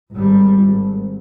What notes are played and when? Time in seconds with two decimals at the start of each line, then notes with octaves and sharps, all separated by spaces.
0.12 G#1 G3
0.61 G#1